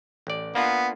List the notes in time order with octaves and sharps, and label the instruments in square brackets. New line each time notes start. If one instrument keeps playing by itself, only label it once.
[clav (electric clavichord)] A1 D5
[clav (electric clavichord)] A#3 D4 F4 [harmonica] B3